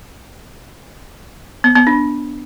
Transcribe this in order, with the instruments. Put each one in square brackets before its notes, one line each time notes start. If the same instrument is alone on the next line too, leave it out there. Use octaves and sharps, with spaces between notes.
[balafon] B3
B3
D4